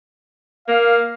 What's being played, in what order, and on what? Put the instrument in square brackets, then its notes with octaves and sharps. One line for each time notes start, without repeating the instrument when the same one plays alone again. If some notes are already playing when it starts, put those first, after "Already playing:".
[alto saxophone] A#3 [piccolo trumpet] F5